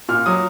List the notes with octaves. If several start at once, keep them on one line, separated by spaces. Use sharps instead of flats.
A#2 F6
F#3 D#6